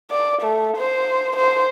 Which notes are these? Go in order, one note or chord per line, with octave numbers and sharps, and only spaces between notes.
D5
A3
C5
C5